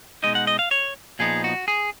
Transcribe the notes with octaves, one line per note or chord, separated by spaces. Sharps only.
B2 G#3 D#4 D#5
F#5
D#5
F5
C#5
A#2 F3 B3 D#4 G#4
F#4
G#4